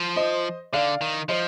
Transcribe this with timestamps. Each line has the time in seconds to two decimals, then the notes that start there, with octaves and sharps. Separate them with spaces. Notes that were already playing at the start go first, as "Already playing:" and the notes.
Already playing: F3
0.16 C5 D#5
0.73 D3 D5 F5
1.01 D#3
1.29 F3 C5 D#5